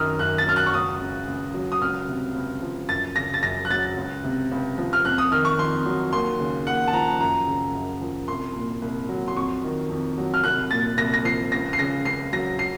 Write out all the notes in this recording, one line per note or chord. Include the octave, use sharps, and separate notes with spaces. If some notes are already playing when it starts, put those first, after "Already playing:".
Already playing: F#2 D#3 A#5 D#6 F6
F#2 F#6
A6
F#3 F6
F#6
C#6
C#2 D#6
C#3
C#2
F#3
D#6
C#2 F6
C3
C#2
F3
F#2 A6
C#3 A#6
A6
F#2 A#6
F#6
F#3 A6
C#2
C3
C#2
F3
F6
F2 F#6
D#6
D#3 F6
C#6
F2 C6
F#3
D#2 C6
C#3
D#2 F#5
A5
F3 A#5
F#2 A#5
C#3
F#2
F3
C2 C6
A#2
C2
F#3
C6
F2 C#6
D#3
F2
F#3
F6
C2 F#6
A#2 A6
C2 A#6
A#6
F3 C7
C#2 A#6
C7
C#3 A#6
C#2 C7
F#3 A#6
C7